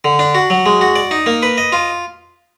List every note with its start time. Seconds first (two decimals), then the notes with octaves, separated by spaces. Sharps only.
0.04 D3
0.19 D4
0.35 F#4
0.50 F#3
0.66 G#3
0.81 F#4
0.96 D5
1.11 D#4
1.26 A#3
1.43 B4
1.58 D#5
1.72 F4